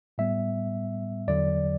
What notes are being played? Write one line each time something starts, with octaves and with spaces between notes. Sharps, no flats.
A2 G3 B3 E5
E2 D3 F#3 D5